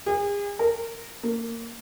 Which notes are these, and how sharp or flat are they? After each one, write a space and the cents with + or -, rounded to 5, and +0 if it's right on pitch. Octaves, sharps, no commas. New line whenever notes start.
G#4 -40
A#4 -20
A#3 -20